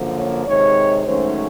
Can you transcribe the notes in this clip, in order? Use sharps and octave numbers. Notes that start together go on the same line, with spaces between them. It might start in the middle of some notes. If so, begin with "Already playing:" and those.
Already playing: F#2 D3 F3 A#3
C#5
C3 D#3 G#3 C#5
G#2 D#3 F#3 A3 C#4 C5